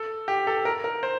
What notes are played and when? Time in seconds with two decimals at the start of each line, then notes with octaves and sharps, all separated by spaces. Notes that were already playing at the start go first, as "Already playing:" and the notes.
Already playing: A4
0.28 G4
0.47 A4
0.65 A#4
0.84 A#4
1.03 C5